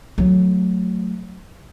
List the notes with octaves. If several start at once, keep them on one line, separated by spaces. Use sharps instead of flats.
F#3 A3